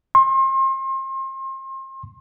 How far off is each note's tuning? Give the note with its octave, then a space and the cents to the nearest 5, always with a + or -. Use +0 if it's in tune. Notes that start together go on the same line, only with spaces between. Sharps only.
C6 +35